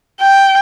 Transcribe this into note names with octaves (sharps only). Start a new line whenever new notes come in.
G5